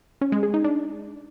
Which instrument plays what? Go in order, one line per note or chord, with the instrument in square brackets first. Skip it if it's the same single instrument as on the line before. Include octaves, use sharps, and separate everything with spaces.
[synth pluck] C#4
G#3
G#4
D#4
D4